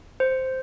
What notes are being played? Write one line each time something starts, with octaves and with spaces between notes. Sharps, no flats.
C5